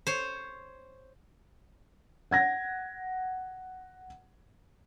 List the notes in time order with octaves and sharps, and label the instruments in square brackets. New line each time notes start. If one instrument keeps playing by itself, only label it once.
[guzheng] C5 C#5
[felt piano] F#5 G#6 A#6